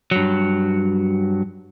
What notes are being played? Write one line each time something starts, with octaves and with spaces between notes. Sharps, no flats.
G2 F#3